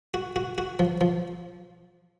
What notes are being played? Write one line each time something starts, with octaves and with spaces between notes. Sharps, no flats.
F#4
F#4
F#4
F3
F3